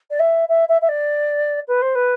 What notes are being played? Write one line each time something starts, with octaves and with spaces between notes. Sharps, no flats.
D5
E5
E5
E5
E5
D5
B4
C5
B4